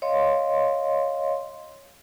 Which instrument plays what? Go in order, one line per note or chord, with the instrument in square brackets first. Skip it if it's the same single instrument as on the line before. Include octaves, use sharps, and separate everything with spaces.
[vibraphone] C#5 D#5 F5 C6